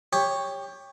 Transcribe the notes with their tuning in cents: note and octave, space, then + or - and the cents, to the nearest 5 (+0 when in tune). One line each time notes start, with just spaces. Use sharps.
G4 +20 C#5 +0